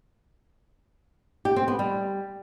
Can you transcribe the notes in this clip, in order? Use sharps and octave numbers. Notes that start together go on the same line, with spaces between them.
G4
C4
B3
G3